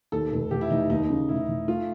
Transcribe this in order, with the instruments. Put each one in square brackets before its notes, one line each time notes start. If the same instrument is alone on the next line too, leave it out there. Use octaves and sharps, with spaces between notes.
[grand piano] D#2 [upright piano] A4
[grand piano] F1
[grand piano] F1 [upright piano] G4
[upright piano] E4
[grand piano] F1 [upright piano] D#4
[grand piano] D#2 [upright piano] D#4
[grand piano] C#3
[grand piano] F1 [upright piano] E4
[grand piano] F1
[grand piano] A3 [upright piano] F4